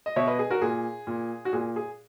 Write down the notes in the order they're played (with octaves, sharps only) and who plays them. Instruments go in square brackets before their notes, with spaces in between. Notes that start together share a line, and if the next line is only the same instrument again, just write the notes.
[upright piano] D#5
B2 C#5 E5
B4 D#5
G#4
F#4 A#4
A#2 G#4
A#2
F#4
A#2 G#4
G#4